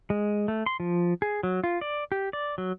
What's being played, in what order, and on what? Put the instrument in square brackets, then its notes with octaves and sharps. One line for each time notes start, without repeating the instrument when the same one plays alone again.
[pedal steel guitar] G#3
A3
C6
F3
G#4
F#3
F4
D5
G4
D5
F#3